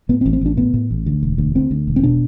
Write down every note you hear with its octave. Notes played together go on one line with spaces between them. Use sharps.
A2 B3
C4
A1
C4
A1 D4
A2 B3
A2
A1
D2
E1
D2
D2 C4
D2
E1
C4
B2 D4